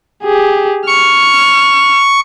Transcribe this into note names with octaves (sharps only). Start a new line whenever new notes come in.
G4 G#4
C#6 F6